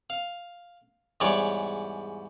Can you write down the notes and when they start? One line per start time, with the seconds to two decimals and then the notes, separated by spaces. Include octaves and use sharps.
0.10 F5
1.20 E2 G#2 G3 C#5 D5